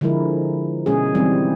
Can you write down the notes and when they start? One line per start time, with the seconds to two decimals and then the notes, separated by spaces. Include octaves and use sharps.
0.01 D3 F3 G#3 E4 A#4
0.86 B2 G#3 C#4 G#4
1.15 E3 G3 G#3 C4 D#4